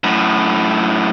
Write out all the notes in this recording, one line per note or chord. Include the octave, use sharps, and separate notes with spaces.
F#2 A2